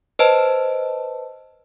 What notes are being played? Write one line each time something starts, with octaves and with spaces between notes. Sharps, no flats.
B4 C5 D#5 A5